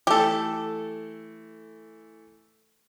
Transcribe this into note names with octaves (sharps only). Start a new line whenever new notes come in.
E3 A3 G4 A4